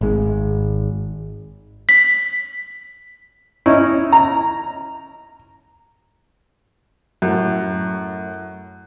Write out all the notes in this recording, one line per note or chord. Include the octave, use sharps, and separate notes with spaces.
G#1 G#3
B6
C#4 D#4 E4
A#5
F#2 A2